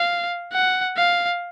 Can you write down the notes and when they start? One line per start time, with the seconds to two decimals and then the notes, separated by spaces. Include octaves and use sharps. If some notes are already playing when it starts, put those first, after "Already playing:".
Already playing: F5
0.53 F#5
0.97 F5